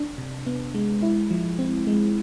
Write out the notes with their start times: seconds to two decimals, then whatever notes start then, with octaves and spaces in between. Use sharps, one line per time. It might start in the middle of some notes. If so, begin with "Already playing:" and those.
Already playing: D4
0.18 C3
0.46 B3
0.75 G#3
1.03 E4
1.30 F3
1.59 C4
1.87 G#3